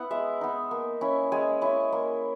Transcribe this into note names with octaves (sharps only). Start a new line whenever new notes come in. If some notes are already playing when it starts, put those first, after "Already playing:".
Already playing: B3 E4 F#5
G#3 E5
B3 D#4
A#3
C#4 E4
G#3 G#5
C#4 E4
A#3